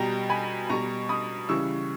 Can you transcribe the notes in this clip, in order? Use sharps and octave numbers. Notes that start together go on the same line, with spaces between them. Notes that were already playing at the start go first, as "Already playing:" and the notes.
Already playing: B2 G3 G5 A#5
G#5 B5
B2 G3 A#5 C#6
B5 D#6
C#3 E3 G3 C#6 E6